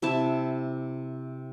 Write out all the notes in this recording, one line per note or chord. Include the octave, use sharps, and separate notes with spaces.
C3 E4 A5